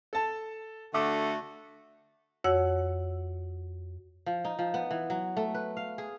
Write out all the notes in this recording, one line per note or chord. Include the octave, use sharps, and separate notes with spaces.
A4 A5
D3 A3 F#4 D6
F2 F#4 C#5 F#5 E6
F3
D#4
F3
B3
E3
F#3
A3
B4
F5
G#4